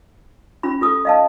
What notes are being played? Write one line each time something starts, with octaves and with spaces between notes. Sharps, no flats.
C#4 F4 B5
F4 A4 D#6
D#5 F5 A5